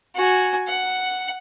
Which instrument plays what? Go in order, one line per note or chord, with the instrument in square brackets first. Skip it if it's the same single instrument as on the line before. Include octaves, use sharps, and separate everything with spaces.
[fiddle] F#4 G#5
F#5